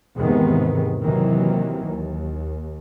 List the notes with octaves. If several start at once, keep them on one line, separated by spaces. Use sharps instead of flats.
E2 G#2 C3 D#3 G#3 B3
C3 D#3 E3 F#3 A#3
D#2